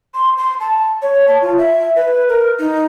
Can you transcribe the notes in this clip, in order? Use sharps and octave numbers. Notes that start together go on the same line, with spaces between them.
C6
C6
A5
C#5
A5
F4
E5
B4
A#4
D#4